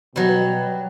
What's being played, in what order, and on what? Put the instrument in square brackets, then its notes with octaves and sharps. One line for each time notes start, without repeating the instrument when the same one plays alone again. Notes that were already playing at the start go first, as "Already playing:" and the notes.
[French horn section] B2 [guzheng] F#3 G3